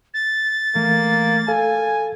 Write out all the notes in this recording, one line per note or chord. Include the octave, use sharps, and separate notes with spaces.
A6
E3 A3 A#3
A4 F5 G#5